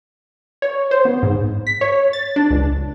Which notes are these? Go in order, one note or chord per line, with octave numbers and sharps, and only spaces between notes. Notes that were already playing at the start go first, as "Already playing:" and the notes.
C#5
C5
B3
G#2
B6
C#5
A6
D4
C#2